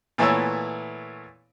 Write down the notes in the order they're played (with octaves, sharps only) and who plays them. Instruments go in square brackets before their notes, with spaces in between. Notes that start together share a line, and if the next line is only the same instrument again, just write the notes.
[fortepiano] A#2 E3 A3 B3 C#5 E6